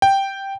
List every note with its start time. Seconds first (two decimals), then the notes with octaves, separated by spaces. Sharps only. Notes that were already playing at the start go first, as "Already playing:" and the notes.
0.02 G5